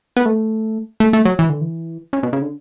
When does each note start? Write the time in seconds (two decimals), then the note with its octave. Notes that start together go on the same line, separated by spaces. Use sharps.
0.17 B3
0.26 A3
1.00 A3
1.13 A3
1.25 F#3
1.39 E3
1.49 D3
1.61 E3
2.13 C#3
2.23 B2
2.33 C#3
2.42 D3